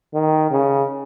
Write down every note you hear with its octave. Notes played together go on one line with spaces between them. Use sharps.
D#3
C#3